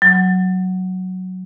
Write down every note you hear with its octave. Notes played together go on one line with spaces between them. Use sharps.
F#3